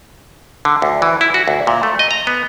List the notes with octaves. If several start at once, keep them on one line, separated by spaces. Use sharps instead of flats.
D3
D2
E3
E4
F#4
D2
A#2
A3
D#5
A#5
B3